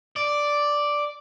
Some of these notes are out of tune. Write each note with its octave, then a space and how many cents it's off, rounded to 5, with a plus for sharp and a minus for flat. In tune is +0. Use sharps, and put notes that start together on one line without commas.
D5 +0